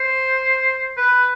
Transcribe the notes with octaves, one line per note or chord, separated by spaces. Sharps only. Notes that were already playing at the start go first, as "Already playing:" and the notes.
Already playing: C5
B4